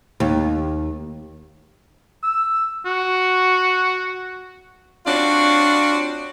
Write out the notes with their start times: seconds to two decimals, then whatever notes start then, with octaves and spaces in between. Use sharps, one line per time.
0.20 D#2
2.23 E6
2.86 F#4
5.06 C4 D4 F4 F#4 C#5 D5